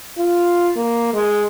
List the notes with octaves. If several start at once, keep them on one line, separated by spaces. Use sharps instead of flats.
F4
A#3
G#3